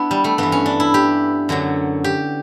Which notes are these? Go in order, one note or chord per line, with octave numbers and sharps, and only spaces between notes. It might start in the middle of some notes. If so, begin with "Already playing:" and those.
Already playing: B3 D4 E4
G3
A3
G2 E3 B3
C#4
D4
E4
G4
F#2 D3 F#3
G4